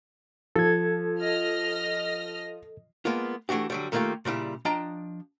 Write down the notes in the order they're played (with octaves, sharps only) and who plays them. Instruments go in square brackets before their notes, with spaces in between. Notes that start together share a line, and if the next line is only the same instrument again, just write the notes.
[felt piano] F3 [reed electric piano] A4 G#6
[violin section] D#5 F6 A#6
[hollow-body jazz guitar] G#3 A#3 B3 F4
E3 A3 D4 F#4 G4
D3 F#3 G3
D#3 A3 A#3 D4 F4 G4
A#2 C#3 G3 E4
F3 D4 D#5 G5 A5 A#5